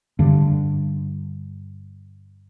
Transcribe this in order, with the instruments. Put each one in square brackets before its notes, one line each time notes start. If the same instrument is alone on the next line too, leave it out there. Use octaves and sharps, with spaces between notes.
[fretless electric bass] G2 D3